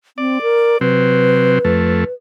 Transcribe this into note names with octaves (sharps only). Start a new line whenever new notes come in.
C4 D5
A#4
C3 F#3 C4 B4
F2 A3